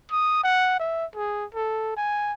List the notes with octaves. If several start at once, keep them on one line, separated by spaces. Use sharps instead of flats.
D#6
F#5
E5
G#4
A4
G#5